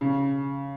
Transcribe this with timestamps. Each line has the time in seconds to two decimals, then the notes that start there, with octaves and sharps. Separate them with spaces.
0.01 C#3